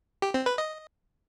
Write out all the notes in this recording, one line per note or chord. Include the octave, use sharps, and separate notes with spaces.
G4
C4
B4
D#5